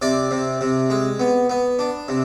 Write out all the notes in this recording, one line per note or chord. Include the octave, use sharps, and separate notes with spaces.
C3 D5
C3
C3
G#3
B3
B3
D4
C3